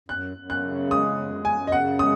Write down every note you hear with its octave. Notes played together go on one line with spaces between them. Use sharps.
F#2 F#6
F#2
F#6
C#3
G#3 D#6
F#2
F#2 G#5
D#5
C#3 F#5
G#3 D#6